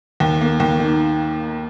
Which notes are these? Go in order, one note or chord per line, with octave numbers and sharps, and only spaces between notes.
D#2
A#3
D#2
D#3